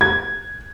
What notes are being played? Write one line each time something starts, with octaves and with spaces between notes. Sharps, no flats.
G#6